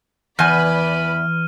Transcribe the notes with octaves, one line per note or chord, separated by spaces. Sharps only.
E2 E3 B4 D5 G#5 B5 F6 D#7